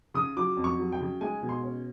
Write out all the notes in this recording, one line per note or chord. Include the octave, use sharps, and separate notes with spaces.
C#3 D#6
F#3 D6
F2
C#6
F#3
G5
C#3
G#3 G#5
B2
C6
C#4